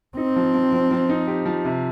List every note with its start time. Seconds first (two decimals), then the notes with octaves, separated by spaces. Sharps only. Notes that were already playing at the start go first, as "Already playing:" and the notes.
0.17 C4 D#4
0.36 F3
0.54 F3
0.72 F3
0.91 F3
1.09 D#4
1.27 G4
1.46 F3
1.65 C3